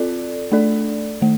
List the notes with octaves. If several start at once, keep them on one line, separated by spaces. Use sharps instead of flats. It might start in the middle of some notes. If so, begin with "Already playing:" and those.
Already playing: C4 F4 A4 D5
A3 D4 A4 D5
D#3 A3